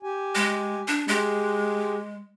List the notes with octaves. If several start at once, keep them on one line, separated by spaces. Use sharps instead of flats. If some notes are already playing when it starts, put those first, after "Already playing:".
G4 G#5
G#3
D4
G#3 G4 G#4